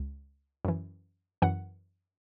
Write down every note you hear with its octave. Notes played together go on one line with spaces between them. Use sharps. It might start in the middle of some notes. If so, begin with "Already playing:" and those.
Already playing: C#2
F#2 E3
F#2 E3 F#5